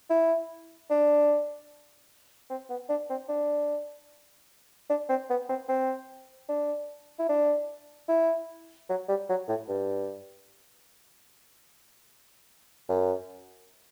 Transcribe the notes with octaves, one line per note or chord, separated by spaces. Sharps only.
E4
D4
C4
B3
D4
C4
D4
D4
C4
B3
C4
C4
D4
E4
D4
E4
F#3
G3
F#3
A2
G2
F#2